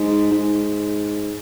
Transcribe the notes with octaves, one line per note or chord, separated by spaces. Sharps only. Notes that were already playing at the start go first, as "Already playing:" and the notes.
Already playing: G#2
G#2